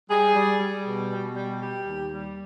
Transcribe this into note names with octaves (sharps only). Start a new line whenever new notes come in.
G3 G#4
G3
G3
B2
B2
G3
G3 G4
D#2
G3